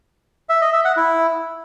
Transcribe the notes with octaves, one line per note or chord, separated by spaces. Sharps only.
E5
D#5
E5
F#5
E4